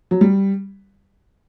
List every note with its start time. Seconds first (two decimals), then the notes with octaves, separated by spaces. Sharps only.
0.11 F#3
0.21 G3